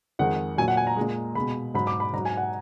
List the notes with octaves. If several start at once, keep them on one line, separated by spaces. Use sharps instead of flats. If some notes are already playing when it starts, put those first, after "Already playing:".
F2 D#3 G#3 F#5
A#2 F#3 G#5
F#5
G#5
A#5
A#2 G#3
B2 G#3 B5
G#2 F#3 B5
D6
B5
G#2 F#3 A#5
G#5
F#5